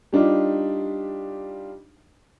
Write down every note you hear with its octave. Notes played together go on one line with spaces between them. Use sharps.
G3 D4 D#4 F4 G4